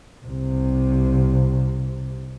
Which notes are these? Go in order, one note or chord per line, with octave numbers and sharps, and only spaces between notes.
C2 C3